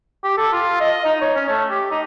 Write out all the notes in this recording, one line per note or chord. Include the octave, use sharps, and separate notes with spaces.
G4
A4
F4
D#5
D#4
C#5
C#4
A3
G4
D#4